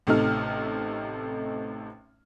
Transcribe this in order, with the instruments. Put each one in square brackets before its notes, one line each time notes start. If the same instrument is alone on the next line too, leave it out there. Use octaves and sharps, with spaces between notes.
[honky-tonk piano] A1 C3 A3 D#4 F6